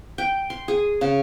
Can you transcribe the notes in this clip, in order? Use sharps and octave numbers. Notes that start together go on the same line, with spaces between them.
G5
C6
G#4
C#3